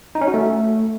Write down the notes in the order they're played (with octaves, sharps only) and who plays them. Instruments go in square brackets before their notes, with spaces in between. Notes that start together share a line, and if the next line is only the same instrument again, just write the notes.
[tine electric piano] D#4
C#4
F#4
A3